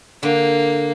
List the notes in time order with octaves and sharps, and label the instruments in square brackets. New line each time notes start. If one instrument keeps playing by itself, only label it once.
[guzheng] D3 [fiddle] A#3